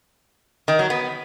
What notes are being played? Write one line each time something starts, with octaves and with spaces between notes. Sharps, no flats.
D#3
F#3
B3